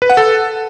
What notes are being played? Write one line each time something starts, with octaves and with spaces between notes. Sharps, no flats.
B4
F#5
A4